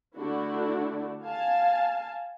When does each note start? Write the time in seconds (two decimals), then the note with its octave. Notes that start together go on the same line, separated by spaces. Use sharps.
0.16 D3 A3 D4 E4 F#4
1.23 F5 G#5 A5